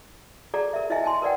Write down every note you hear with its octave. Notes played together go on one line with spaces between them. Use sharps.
G#4 A4 D5 A#5
A#4 E5
E4 D#5 E5 G#5
G#5 A5 C6
A#4 B4 D5 F#5 G5